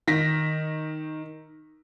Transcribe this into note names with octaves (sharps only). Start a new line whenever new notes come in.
D#3 A#6 B6